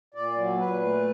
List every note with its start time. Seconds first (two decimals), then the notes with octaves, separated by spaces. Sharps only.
0.14 A#2 D5
0.37 F#3
0.59 A#2 B4
0.82 A3